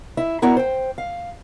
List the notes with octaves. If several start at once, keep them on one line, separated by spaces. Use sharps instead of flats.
E4 E5
B3 E4 F#4 A#4 D5 A#5
C5 G5
F5